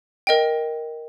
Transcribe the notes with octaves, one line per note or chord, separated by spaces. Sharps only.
A#4 D#5 G5